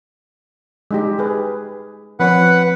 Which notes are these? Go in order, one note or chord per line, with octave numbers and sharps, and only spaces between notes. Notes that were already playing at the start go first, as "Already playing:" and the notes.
G#3 D#4 G4
G4 G#4 B4
F3 C4 B4 C#5 F#5